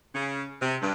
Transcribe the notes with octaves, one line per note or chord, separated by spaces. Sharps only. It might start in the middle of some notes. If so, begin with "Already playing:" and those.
C#3
C3
G2